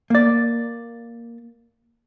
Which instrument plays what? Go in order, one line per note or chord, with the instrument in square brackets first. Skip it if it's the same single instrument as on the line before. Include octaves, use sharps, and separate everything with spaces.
[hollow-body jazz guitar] A#3 D5